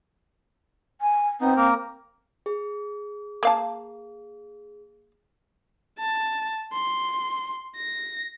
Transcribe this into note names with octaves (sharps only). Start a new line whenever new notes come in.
G#5
B3 C4 D#4
A#3 A#4
G#4
A#3 F5 A5
A5
C6
A#6